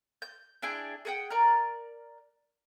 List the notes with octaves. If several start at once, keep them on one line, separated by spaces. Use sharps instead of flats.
G6
D4 E4 G#4 G5
G#4 A4 F#5 G5
A#4 D5 A#5 F6